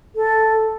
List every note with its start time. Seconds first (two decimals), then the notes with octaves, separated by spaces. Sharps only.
0.16 A4